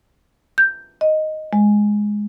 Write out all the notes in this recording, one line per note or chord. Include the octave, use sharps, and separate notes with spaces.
G6
D#5
G#3